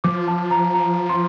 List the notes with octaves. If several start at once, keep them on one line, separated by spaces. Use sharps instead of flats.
F3 D6
A5
A#5
A#5
C6